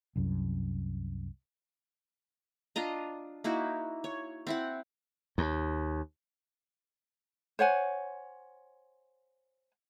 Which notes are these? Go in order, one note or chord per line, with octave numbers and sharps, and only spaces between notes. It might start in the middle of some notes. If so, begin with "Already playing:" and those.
C2 F#2
D4 F4 D#5 A#5
A#3 D#4 E4 F#4
C#5
C4 E4 F#5
D#2
C5 C#5 F#5 G#5